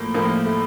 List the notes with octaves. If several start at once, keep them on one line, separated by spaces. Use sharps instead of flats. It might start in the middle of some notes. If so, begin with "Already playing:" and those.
Already playing: A2 F3 A3 A#3
A2 F3 A#3
A3